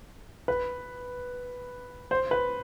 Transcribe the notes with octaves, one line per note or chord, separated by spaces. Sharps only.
B4
C5
B4